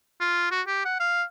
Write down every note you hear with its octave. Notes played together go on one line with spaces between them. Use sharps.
F4
F#4
G4
F#5
F5